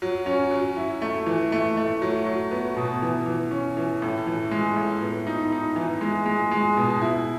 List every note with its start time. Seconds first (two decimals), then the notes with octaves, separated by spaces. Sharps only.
0.02 F#3
0.26 C#4
0.51 F#3
0.77 E4
1.02 A3
1.26 E3
1.52 A3
1.77 A3
2.02 F#3
2.26 F#3
2.51 B3
2.76 B2
3.02 E3
3.26 E3
3.51 C#4
3.77 E3
4.02 A2
4.27 E3
4.51 G#3
4.77 A2
5.02 B3
5.27 D#4
5.52 D#4
5.76 E3
6.01 G#3
6.26 G#3
6.51 G#3
6.77 B2
7.01 E4